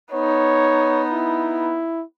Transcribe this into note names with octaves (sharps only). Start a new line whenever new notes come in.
B3 D#4 C#5
E4